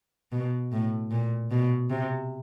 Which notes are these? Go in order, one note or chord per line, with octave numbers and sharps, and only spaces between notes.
B2
A2
A#2
B2
C3